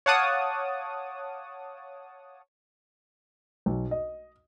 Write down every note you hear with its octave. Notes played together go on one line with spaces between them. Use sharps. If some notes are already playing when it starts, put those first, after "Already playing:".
C#5 F5 F#5 A5 D6 D#6
B1
D#5